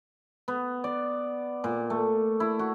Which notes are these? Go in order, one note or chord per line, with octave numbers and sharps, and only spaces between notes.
B3
D5
A#2
A3
E4
F#4